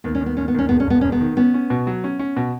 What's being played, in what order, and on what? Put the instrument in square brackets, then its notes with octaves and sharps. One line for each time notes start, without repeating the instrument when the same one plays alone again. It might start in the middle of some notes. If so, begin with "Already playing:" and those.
[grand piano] D#2 [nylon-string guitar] B3
[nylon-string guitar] C#4
[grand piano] D#2
[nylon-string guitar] B3
[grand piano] D#2 [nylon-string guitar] C#4
[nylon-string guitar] B3
[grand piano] D#2 [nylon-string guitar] C#4
[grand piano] E1 [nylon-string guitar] B3
[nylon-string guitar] C#4
[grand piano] E1 [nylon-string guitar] B3
[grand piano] E1 [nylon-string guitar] C#4
[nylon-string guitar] B3
[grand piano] D#3
[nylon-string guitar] B3 [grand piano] C#4
[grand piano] C#4
B2
F#3
C#4
C#4
B2